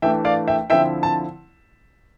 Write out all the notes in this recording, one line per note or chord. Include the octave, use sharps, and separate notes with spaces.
E3 A3 D4 E5 G5
D5 F5
E5 G5
D3 F3 C4 E4 E5 G5
A5